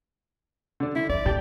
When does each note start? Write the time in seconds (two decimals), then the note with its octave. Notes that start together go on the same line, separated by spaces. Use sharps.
0.80 D3 D4
0.95 D3 E4
1.09 F2 D5
1.26 A#2 G4 A5